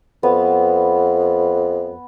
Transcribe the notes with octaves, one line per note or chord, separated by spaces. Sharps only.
F2 B3